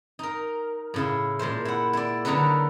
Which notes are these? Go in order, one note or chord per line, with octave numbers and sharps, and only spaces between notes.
D#4 A#4
A2 C#3 E4
A#2 G#3 A3 C5
E4 F#5
E4 D5
D3 D#3 F#3 D#4 A4 B4